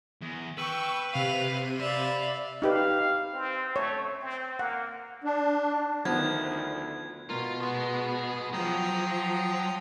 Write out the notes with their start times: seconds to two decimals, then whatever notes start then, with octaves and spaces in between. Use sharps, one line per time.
0.22 E2
0.58 B4 G5 C#6 E6
1.13 C3 F5 D#7
1.80 D5 E5 F5 B5
2.62 D#4 G4 B4 F5
3.34 C4
3.76 A3 C#5
4.22 C4
4.59 A#3 F#5
5.24 D4
6.05 D2 D#3 F3 B3 G#6
7.29 B2 F4 A#4
7.61 B3 G#4 C6
8.53 F3 F#3 G5 A#5 D#6